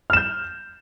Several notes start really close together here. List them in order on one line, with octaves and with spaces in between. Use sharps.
F6 E7 G6